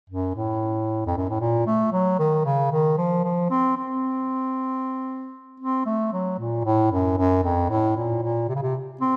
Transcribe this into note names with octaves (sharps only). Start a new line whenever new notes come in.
F#2
A2
F2
F#2
A2
A#2
A3
F#3
D#3
C#3
D#3
F3
F3
C4
C4
C4
A3
F#3
A#2
A2
F#2
F#2
F2
A2
A#2
A#2
C3
C#3
C3
C4